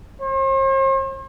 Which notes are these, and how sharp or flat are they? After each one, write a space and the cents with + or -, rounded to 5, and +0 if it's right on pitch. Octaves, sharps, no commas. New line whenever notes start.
C5 +45